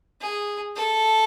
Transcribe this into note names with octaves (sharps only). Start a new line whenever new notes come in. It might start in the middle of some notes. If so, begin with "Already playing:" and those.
G#4
A4